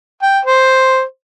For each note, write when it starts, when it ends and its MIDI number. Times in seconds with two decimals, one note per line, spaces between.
0.22 0.39 79
0.45 1.02 72